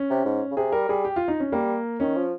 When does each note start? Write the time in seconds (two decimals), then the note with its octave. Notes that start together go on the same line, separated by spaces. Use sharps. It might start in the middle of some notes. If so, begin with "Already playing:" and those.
Already playing: C#4
0.10 C3
0.25 G#2
0.51 C#3
0.57 C3 G#4
0.72 G3 A#4
0.89 G3 G#4
1.05 G4
1.16 F4
1.28 D#4
1.40 C#4
1.52 G3 A#3
2.00 D#3 C#4
2.17 F3